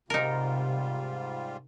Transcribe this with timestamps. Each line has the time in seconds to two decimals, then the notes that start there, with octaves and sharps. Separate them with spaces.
0.10 G#2 C3 G3 D#4 F4 A#4